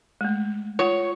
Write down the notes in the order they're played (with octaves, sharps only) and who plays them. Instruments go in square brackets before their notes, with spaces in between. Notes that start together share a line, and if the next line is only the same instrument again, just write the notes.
[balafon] G#3 A3
[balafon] F4 F#5 [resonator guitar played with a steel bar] C#5